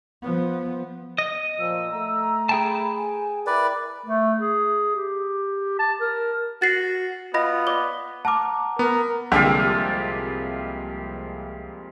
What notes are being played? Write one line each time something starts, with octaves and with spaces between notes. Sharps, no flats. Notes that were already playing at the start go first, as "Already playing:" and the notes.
F3 B3
D#5
A#2 F3 E6
A3 A#5
G#4 G5 A5 B5
G#5
E4 A#4 B4 D5 G5
A3
G#4
G4
A5
A#4
F#4 A6 C7
B3 F4 D#5 B5 A#6
D5 D6 G7
F#5 A5 A#5 D6 F6
B3 A#4
C2 F2 D3 G#3 A#3 F4 G4 E5